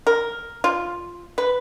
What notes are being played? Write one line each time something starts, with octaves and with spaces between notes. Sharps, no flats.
A#4
F4
B4